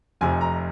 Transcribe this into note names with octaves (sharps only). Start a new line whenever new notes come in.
F1 F2 C3 G#5
A#5